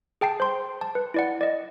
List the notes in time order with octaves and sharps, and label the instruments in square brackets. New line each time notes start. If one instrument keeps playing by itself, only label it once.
[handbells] G#4 G5 A5 C7
C5 C6
A5
B4
E4 D5 F#5
D5 D#5